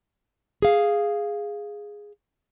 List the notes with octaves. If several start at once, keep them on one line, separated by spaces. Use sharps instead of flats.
G#4 F5